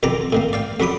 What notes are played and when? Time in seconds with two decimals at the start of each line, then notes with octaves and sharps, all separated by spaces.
0.03 B1 F2 D#3 A4 A#5 D6
0.32 A2 D#3 A#3
0.53 D5 F5 G5
0.80 F2 F#3 F#5 B5 D6 D#6